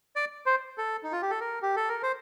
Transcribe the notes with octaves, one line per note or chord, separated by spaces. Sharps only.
D5
C5
A4
D#4
F4
G4
A4
A#4
G4
A4
A#4
C5